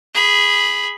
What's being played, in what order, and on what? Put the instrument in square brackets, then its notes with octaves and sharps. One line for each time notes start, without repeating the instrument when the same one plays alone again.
[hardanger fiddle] G#4 B5